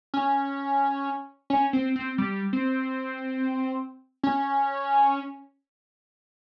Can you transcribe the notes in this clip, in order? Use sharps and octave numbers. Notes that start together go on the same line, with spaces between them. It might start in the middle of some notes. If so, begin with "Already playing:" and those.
C#4
C#4
C4
C4
G3
C4
C#4